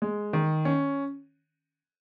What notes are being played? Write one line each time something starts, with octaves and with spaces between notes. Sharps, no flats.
G#3
D#3
C#4